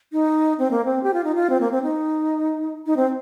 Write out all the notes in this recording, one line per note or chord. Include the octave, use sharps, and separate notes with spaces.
D#4
C4
A#3
C4
G4
F4
D#4
F4
C4
A#3
C4
D#4
D#4
C4